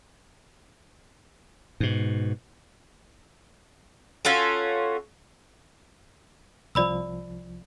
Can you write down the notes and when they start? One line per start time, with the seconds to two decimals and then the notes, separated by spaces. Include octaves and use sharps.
1.80 G#2 B2
4.25 C#4 F4 F#4 A4
6.75 C2 F3 D5 B5 E6